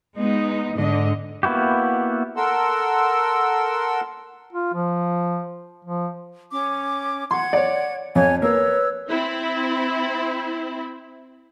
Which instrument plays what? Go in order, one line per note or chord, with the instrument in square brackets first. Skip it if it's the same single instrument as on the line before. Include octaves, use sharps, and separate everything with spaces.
[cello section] G#3 B3 D#4
G#2 D3 D#5
[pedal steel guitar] A#3 B3 E4 F#4 G4
[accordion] A4 A#4 F#5 C6 E6
[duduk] F4
F3
F3
[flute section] C#4 D6
[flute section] F#5 G#6 [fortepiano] C6
[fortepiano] C#5 D5
[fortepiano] F2 [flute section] C#5 G#5
[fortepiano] A#3 A#4 [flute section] B4 C#5 E6
[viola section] C4 E4